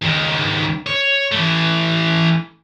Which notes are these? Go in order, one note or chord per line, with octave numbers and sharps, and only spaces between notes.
C#2 D#3
C#5
E3 A3